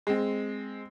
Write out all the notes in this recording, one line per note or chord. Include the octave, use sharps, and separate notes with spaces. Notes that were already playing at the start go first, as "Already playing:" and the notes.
G#3 C4